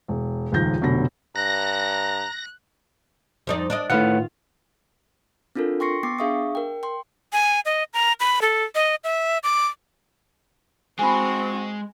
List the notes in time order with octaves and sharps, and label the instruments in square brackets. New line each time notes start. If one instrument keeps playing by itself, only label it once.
[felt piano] E1
D#1 C#2 D#3 F3 G6 A#6
F1 B2 D3 F#3 B5 A#6
[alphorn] G2 [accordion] A#5 [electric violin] F#6 [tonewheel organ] A#6
[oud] F2 D#4 D5
D4 D5 D#5
[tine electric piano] A2 B4 F#5 [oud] D#3 F4
[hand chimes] C4 D4 F4 A4 A#4
G5 C6 C#6 A#6 C7 C#7
B3 G5 D6 A6 C7
D4 G#4 E5 F5 C#6 D#6
A#4 G5
G5 C6
[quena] G#5
D#5
A#5
B5
A4
D#5
E5
D6
[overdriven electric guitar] G#3 [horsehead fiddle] C4 F#4 [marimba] G#5 B5